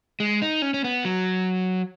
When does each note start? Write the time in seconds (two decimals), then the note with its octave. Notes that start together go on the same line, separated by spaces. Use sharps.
0.20 G#3
0.42 D#4
0.62 C#4
0.74 C#4
0.84 B3
1.05 F#3